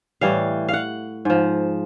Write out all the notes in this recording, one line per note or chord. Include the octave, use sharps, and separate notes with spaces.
A2 E3 G3 F5
F5
F#5
G#2 F3